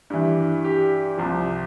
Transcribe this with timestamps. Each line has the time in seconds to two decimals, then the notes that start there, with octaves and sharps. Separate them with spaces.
0.10 G2 E3
0.64 G4
1.18 C2 C3 F3